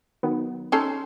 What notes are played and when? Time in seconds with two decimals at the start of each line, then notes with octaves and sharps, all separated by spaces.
0.23 D#3 F#3 B3
0.72 C#4 D#4 A4 C6